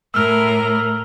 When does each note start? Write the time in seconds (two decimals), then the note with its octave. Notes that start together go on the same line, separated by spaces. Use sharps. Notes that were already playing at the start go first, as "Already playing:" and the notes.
0.14 A2 A#4 E6 F6